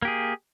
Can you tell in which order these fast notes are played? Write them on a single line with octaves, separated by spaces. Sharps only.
A#3 G4 G#4